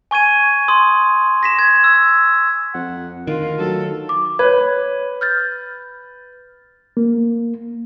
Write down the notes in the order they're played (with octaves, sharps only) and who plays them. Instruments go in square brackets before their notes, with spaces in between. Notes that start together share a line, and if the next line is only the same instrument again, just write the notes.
[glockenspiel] G#5 C#6 G#6 D#7
C6 D#6
A#6 B6 E7
G#6
E6
[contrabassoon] F2 [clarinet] F#5
[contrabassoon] D2 [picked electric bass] D#3 [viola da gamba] F4 [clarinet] A#4
[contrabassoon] F#3 [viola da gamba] A4
[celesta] D6
[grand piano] B4 [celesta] C#5 G#6
[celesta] F6 G6 A6
[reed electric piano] A#3